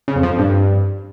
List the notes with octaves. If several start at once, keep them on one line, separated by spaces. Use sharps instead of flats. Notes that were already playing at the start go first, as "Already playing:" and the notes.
C#3
F2
F3
F2
G2